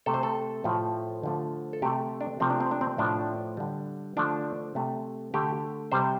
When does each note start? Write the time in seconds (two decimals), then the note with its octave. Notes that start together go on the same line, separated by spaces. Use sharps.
0.06 C3 A3 A4
0.14 C5
0.23 A4
0.64 A2 F3 A3
1.23 D3 F3 A3
1.73 A4
1.82 C3 G4
1.85 A3
2.21 D4
2.40 C3 F3 A3 C4
2.50 D4
2.60 C4
2.71 D4
2.81 C4
2.98 A2 F3 A3 D4
3.57 D3 G3
4.17 D3 F3 A3 D4
4.75 C3 A3
5.34 D3 A3 G4
5.92 C3 G3 C5